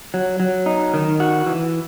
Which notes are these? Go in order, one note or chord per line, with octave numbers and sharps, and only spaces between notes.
F#3
F#3
D#4
D#3
F#4
E3